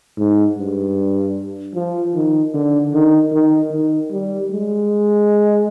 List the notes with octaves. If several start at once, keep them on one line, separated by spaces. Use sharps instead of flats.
G#2
G2
F3
D#3
D3
D#3
D#3
D#3
G3
G#3